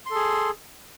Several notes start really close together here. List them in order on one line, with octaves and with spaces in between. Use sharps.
C6 A4 G#4